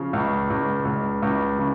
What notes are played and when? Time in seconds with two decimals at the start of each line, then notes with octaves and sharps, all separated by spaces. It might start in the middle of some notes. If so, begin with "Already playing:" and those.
Already playing: C#3 F3
0.13 C#2
0.50 C#2
0.85 C#2
1.22 C#2
1.59 C#3